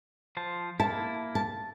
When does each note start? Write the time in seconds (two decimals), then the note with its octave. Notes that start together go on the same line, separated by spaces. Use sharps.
0.37 F3 C5 A5
0.80 A#3 E4 A5
1.35 A5